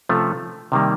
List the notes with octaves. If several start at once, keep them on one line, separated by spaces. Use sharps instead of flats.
C3 F3 A3 C#4 F4
C3 D#3 G3 A#3